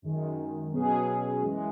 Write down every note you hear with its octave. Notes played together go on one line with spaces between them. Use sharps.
F#2 D#3 G#3
B2 F#3 C#4 G#4
F#2 E3 G#3